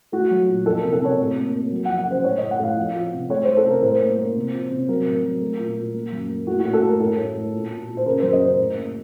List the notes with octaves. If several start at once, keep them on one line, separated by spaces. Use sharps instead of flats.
A3 F#4
F#3
A#2
F2 A4
C3 A#4
A4
C3 C#5
A2
A#3
A#3
F#3
F2 F#5
F#5
C#3 C5
A2 C#5
A2 D#5
F#5
A2 F5
F2
F3
C3
A3 C#5
A3 C5
A4
C3
A#4
A2 C5
A#3
A#3
C3
F3
C3
F#3 A#4
A2
F#3
A3
A#2
A#2
A#3
F#2
A#3
A3 F#4
F#4
A2
A4
A3 A#4
A2 A4
A2
A2
A#2
A#2
A#2
C5
C#3 A#4
F#2 C5
D#5
C#3 C5
A2
A#3